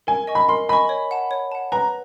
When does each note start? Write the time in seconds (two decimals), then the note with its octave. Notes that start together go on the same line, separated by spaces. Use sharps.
0.07 A#4 G#5
0.27 D#5 G#5 C#6
0.35 B5
0.49 A#4 C6
0.69 D#5 G#5 B5 C#6
0.89 C#5
1.11 F#5 A5
1.31 C#5
1.52 F#5 A5
1.72 B4 A#5